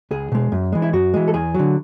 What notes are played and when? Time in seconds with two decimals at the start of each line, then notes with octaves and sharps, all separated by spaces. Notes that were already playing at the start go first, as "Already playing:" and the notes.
0.11 C#2 G#4
0.32 B2 G#3
0.52 F#2
0.72 E3 G#3
0.82 E4
0.93 F#2 F#4
1.14 E3 G#3
1.28 A4
1.34 E2 G#4
1.54 D3 F#3